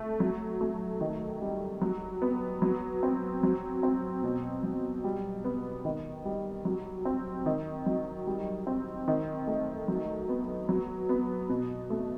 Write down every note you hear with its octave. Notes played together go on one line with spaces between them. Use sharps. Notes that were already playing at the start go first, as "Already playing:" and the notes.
Already playing: A3
F#3
A3
D#3
G3
F#3
B3
F#3
C4
F#3
C4
B2
F#3
G3
B3
D#3
G3
F#3
C4
D#3
F#3
G3
C4
D#3
A3
F#3
B3
F#3
B3
B2
A3